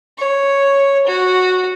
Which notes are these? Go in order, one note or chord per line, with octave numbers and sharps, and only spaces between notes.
C#5
F#4